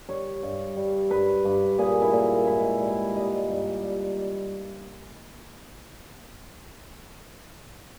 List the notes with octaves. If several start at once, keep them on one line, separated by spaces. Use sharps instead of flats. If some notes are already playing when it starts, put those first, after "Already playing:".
G3 C#5
G2
G3
G2 B4
G2
A#2 G#4
E4
A#2
G#2 E4
G3
G3 D#5
G2
G3